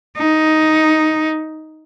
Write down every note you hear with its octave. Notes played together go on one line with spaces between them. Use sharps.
D#4